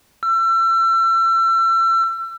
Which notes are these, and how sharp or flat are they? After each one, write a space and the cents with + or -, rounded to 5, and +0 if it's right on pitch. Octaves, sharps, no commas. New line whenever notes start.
E6 +35